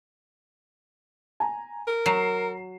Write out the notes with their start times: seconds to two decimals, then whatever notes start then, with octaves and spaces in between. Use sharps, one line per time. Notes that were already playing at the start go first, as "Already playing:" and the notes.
1.40 G#5 A#5
1.87 A#4
2.06 F#3 A#5 C7 E7